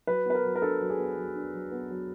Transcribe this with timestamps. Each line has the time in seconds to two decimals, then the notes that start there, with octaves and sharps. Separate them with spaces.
0.07 F#3 B4
0.26 B3 B4
0.35 A#4
0.44 F#3
0.56 A#4
0.62 D4 A4
0.81 F#3
0.90 G#4
0.99 B3
1.17 F#3
1.35 D4
1.54 F#3
1.72 B3
1.90 F#3